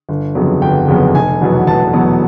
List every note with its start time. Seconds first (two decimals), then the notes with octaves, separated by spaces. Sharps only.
0.09 G1
0.35 F2 C#3 F#3 B3
0.62 G1 G5
0.88 F2 C#3 F#3 B3
1.15 F1 G#5
1.41 E2 B2 F#3 B3
1.67 F1 A5
1.93 E2 B2 F#3 B3